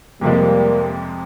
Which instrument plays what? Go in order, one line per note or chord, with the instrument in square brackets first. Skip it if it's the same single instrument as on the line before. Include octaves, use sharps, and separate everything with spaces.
[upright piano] F2 C3 F3 G#3 [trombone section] G3 A#3